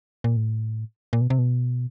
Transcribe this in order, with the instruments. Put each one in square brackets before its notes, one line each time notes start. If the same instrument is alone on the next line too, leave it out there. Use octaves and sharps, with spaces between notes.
[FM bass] A#2
A2
A#2
B2
C3
B2